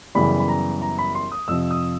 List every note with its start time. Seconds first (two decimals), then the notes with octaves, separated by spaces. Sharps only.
0.15 F#2 C#3 E3 G3 B3 B5
0.40 B5
0.48 A#5
0.82 A#5
0.99 B5
1.15 C6
1.32 D#6
1.48 F2 C3 F3 E6
1.71 D#6